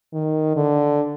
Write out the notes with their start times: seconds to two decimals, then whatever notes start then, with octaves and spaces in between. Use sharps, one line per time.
0.13 D#3
0.56 D3